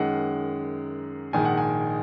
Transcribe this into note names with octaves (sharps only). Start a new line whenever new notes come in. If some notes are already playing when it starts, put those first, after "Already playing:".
Already playing: F#2 D#3 G#3 F#5
A#1 G#2 D#3 G#3 G#5
F#5
G#5